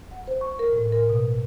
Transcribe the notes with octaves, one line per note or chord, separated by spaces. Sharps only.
F#5
C5
C#6
A#4
A2
A#4
B2